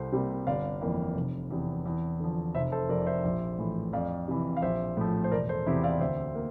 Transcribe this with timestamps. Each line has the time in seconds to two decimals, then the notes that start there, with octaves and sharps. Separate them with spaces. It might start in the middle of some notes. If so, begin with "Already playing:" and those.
Already playing: C2 A4 C5
0.12 C3 G3 A#3
0.47 G1 D5 F5
0.81 F2 E3 A#3
1.16 F1
1.50 E2 C3
1.86 E2
2.20 D3 F3
2.55 F1 C5 E5
2.72 A4 C5
2.89 F2 C3 A#4 D5
3.02 D5
3.06 C5 E5
3.24 A#1
3.58 A2 E3
3.93 F2 D5 F5
4.28 C3 E3
4.57 F5
4.62 A#1 C5 E5
4.97 A2 F3
5.24 C5
5.31 E1 A#4 D5
5.49 A4 C5
5.66 E2 C3 E4 G4
5.83 D5 F5
6.01 D2 C5 E5
6.35 A#3